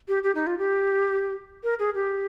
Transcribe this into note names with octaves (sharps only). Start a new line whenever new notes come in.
G4
G4
D#4
F4
G4
A#4
G#4
G4